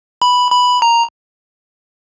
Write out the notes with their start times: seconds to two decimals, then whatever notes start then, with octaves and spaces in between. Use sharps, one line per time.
0.22 B5
0.51 B5
0.82 A#5